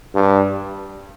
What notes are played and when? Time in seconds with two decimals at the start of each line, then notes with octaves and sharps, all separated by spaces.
0.15 G2